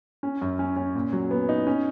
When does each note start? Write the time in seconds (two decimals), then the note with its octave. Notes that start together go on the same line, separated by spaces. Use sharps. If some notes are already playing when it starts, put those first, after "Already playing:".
0.23 C#4
0.41 F#2
0.59 C#4
0.76 C#4
0.95 A#2
1.13 F#3
1.31 B3
1.49 D#4
1.67 C#4